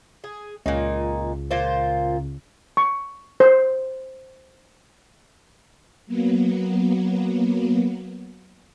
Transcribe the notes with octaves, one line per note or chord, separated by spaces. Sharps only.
G#4
C#2 A#2 D#4
A#2 F4 C5
C#6
C5
F#3 A#3 B3